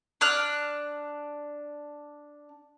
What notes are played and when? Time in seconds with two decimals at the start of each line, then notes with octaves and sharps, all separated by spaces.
0.21 D4 D6 F6 F#6